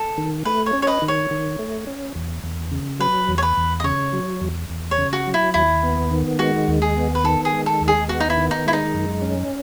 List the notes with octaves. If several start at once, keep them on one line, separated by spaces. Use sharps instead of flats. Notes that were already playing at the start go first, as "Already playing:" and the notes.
Already playing: A4
D#3
A3 B4
C#5
C#4
C#5
B4 D#5
D#3
C#5
D#3
A3
C#4
E2
E2
C#3
F#3 B4
E2
C#5
B4
E2
D#5
C#3 C#5
F#3
E2
E2
C#5
C#3
F#4
F#3
E4
D#2 E4
B3
D#3
G#3 F#4
D#2
G#4
B3
B4
D#3 A4
G#4
G#3
A4
D#2
G#4
B3 F#4
D#4
E4
D#3
D#4
G#3 E4
D#4
F#2
C#4